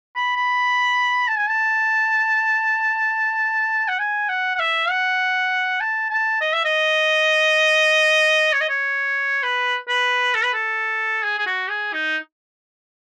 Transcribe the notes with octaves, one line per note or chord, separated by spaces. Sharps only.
B5
B5
A5
G#5
A5
F#5
G#5
F#5
F#5
E5
F#5
A5
A5
D#5
E5
D#5
C#5
D#5
C#5
B4
B4
A4
B4
A4
G#4
G#4
F#4
G#4
D#4